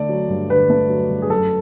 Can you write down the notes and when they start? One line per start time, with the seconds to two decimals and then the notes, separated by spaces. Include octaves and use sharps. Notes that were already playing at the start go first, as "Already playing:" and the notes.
Already playing: D3 A3 D5
0.09 F#3
0.29 G2
0.50 D3 B4
0.70 A3
0.90 F#3
1.10 G2
1.22 G#4
1.30 F#2 A4